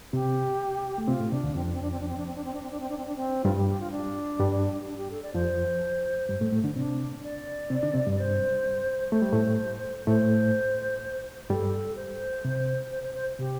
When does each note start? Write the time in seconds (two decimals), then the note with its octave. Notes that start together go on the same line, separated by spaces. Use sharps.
0.13 C3 C4 G4
0.98 A3
1.07 C3 C4 F4
1.20 A2 A3
1.32 C3 D4
1.43 D2 D3
1.55 F2 F3 C4
1.64 D4
1.73 C4
1.82 D4
1.91 C4
2.00 D4
2.08 C4
2.17 D4
2.27 C4
2.35 D4
2.44 C4
2.54 D4
2.62 C4
2.71 D4
2.80 C4
2.89 D4
2.97 C4
3.06 D4
3.16 C4
3.44 G2 G3 F4
3.57 G4
3.69 G4
3.80 F4
3.92 D4
4.39 G2 G3
4.86 D4
4.98 G4
5.11 A4
5.23 D5
5.34 F2 F3 C5
6.29 G2 G3
6.41 A2 A3
6.53 A2 A3
6.64 D3 D4
6.76 C3 C4 D4
7.23 D5
7.70 C3 C4
7.83 D3 D4
7.94 C3 C4
8.06 G2 G3
8.18 C5
9.12 A3 C5
9.22 G3
9.32 A2 A3
10.07 A2 A3 C5
11.50 G2 G3 A4
11.96 C5
12.45 C3
12.92 C5
13.03 C5
13.14 C5
13.39 C3 G4